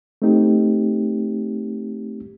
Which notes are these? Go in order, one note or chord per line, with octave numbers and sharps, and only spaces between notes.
A3 C4 D#4 G4